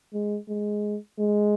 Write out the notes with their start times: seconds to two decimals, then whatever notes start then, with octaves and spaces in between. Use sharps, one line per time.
0.14 G#3
0.48 G#3
1.19 G#3